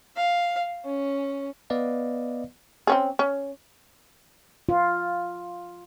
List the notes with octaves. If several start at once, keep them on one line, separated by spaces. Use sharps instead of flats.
F5
C#4
B3 B4 D5 D#5 F5
C4 C#4 G#4
C#4
F4